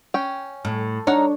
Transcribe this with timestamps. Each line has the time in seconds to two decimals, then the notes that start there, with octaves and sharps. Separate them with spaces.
0.14 C#4 G5
0.65 A2
1.07 D4 D#4 A#4 C#5 F#5